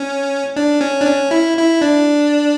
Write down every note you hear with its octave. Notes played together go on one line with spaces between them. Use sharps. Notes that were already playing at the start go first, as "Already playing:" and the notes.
Already playing: C#4
D4
C#4
D4
C#4
E4
E4
D4